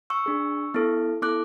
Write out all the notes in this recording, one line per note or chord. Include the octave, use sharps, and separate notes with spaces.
C#6 E6
D4 G#4
B3 E4 A4
B3 E4 A4 D6 F#6